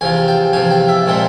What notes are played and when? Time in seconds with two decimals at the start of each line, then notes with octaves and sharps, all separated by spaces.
0.01 E2 C3 F3 G#5
0.28 G5
0.53 F3 G#5
0.56 E2 C3
0.71 G5
0.88 E5
1.06 A#2 F3 G#3 C4